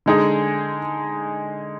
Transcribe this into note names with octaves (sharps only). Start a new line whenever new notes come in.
D3 G#3 D#4 G#4